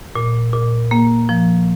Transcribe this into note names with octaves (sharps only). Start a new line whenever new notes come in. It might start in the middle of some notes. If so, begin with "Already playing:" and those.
A#2
A#2
A#3
F3